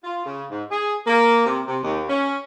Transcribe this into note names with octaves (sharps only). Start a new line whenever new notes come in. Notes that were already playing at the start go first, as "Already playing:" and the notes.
F4
C#3
G#2
G#4
A#3
C3
C3
D#2
C#4